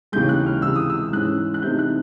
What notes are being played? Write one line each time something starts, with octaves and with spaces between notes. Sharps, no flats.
D#2 C#3 E3 G#3 G6
F#6
F6
C#2 C3 E3 E6
D#6
E6
G#2 E3 G#3 C#4 F#6
F#6
C3 E3 A3 C4 D#4 G6
F#6